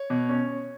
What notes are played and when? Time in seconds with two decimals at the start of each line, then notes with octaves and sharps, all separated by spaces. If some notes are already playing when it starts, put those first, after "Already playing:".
Already playing: C#5
0.10 B2
0.29 C#4